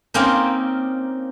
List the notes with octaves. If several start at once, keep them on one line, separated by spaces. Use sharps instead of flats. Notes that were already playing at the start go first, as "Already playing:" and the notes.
A#3 C4 C#4 D#4